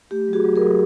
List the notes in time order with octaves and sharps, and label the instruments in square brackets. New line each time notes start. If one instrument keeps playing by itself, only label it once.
[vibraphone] A3 G4
F#3
F#4 G#4
F#3
G#4 A#4
F#3